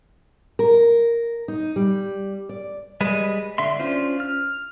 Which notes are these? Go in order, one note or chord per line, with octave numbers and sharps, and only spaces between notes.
A#4
D#4
G3
D5
G3 G#3 B4
D3 E5 C6
C#4 D4 F4 C5
F6